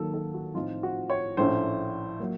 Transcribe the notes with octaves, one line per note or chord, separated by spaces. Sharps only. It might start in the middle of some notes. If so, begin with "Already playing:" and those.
Already playing: D#2 D#3 F#3 A#3 D#4 A4
A4
F#4
A2 F3 C4 D#4 F4
F#4
C#5
A#1 A2 A3 C#4 C5
F#3 A#3